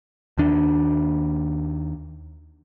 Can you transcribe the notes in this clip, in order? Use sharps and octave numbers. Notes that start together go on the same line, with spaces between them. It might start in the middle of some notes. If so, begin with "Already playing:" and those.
D#2 D#3 D4